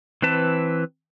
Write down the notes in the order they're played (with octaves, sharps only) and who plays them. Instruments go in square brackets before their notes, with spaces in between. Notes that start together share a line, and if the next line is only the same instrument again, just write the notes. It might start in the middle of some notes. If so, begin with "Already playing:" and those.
[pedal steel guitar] E3 C4 B4 A5